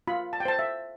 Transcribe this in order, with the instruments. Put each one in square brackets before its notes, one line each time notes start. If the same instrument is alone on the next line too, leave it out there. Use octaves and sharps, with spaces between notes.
[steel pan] F4 B5
A5
G5
C5 A5
E5